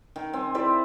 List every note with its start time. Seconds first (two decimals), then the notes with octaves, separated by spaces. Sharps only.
0.16 D#3
0.33 C4 G#5
0.54 E4 C5 D5 E5